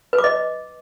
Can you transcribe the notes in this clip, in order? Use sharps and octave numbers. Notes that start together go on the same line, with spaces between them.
B4
D6
D#5